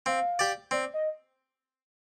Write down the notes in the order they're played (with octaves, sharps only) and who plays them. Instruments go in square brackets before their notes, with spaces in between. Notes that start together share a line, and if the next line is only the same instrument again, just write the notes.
[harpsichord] C4 [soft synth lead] F5
[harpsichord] G4 D5
[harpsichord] C4 [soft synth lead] D5
[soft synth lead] D#5